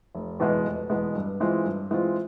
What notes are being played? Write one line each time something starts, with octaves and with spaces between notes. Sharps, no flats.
F1
E2 B2 G#3 B3
F1
E2 B2 G#3 B3
G2
E3 G#3 C4 F4
G2
E3 G#3 C4 F4